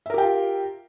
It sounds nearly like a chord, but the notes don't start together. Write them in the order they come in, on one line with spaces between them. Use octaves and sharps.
E5 A#4 G4 G5 F4